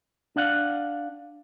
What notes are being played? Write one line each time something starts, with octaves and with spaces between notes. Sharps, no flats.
D4 D5 F5 F#5